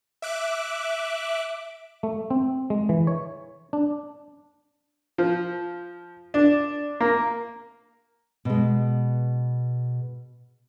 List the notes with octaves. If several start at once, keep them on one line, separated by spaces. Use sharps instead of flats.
E5 D6 F#6
A3
C4
G#3
E3
C#5
D4
F3
D4
A#3
B2 G#3